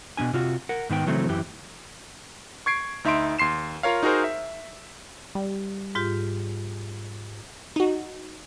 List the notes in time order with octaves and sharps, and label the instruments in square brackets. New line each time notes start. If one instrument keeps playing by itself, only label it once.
[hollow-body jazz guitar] B2 D#3 D4 G#5
C3 F4 F#4
A#4 F#5
G#2 D#3 B3 G5
C#3 E3 F#3 A3 C4
F#2 E3 G4
[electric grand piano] C#6 G#6 C7 D7
D2 D#4 E5 C6 D7
D#2 C6 C7 E7
F4 A#4 C#5 F5
D#4 F#4 G#4 A#4 C5
E5
[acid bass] G3
[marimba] G#2 F4 G4
[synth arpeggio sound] D#4 F#4